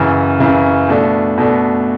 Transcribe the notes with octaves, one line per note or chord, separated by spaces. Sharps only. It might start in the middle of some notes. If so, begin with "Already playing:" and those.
Already playing: F#2 C#3 E3
F#2 C#3 E3
B2 A3 D4
B2 A3 D4